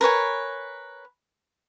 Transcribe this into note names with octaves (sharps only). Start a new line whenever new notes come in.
A#4 B4 C#5 G#5